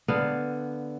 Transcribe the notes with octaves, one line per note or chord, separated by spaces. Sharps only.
D3 B3 F5